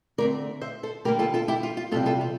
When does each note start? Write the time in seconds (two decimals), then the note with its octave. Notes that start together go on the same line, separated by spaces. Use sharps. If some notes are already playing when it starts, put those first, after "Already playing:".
0.18 D3 A3 C4 A#4 D5
0.61 C5 E5
0.83 A4 C5
1.05 D3 G3 A#3 G4 A#4
1.19 F4 A4
1.34 F4 A4
1.48 E4 G4
1.63 F4
1.77 F4
1.91 E2 C3 G3 F4 A4
2.06 F4 A4
2.21 F4